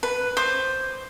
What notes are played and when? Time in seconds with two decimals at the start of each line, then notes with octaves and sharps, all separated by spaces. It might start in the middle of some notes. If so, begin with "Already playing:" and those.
0.03 B4
0.37 C5 D6